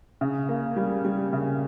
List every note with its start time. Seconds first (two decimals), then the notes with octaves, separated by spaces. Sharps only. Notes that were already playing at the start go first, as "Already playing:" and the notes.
0.21 C#3
0.49 A#3
0.76 G3
1.05 G3
1.33 C#3